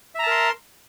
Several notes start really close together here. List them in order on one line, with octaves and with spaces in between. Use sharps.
E5 A#5 A5 A#4 C6